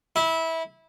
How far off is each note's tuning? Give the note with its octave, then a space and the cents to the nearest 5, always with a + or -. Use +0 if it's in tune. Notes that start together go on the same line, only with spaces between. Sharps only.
E4 -20